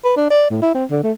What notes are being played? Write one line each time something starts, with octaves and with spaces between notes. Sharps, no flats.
B4
D4
D5
A2
E4
C4
D3
A3